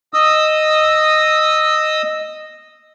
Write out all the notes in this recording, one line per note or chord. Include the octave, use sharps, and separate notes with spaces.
D#5 D#6 E6